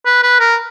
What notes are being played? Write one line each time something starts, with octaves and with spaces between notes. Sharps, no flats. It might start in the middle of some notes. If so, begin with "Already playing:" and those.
B4
B4
A#4